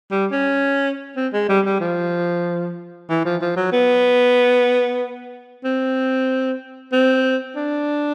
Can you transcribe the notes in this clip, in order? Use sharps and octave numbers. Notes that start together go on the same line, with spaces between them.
G3
C#4
C4
G#3
G3
G3
F3
E3
F3
F3
F#3
B3
C4
C4
D4